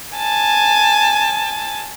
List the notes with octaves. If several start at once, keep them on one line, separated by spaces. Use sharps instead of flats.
G#5 A5